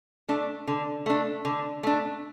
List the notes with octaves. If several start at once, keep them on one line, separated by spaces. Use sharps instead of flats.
A3 D4
D3
A3 D4
D3
A3 D4